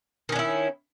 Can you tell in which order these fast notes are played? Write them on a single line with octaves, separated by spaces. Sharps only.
D#3 C#4 D4 E4